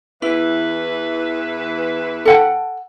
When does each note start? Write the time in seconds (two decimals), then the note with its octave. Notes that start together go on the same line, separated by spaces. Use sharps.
0.22 E2 E3 E4 B4
2.25 A4 F#5 G5